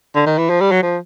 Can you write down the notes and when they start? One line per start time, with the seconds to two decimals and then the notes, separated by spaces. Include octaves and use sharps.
0.16 D3
0.26 D#3
0.38 E3
0.50 F3
0.60 G3
0.72 F#3
0.83 F3